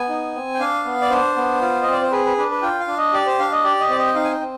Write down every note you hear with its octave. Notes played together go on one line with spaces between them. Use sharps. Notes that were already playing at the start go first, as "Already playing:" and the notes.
Already playing: B3 G#5
D#4
C4
G5
D4 F5
B3
D5
D4 C5
B3
F4
C4 D#5
D5
C5
G#4 B4
B4
D4 B4
B4
F4 G5
F5
D4
D#5
G4 D5
C5
D4 F5
D#5
G4 D5
D#5
C4 D5
D#5
G5
D#4 F5
G#5
G5
C4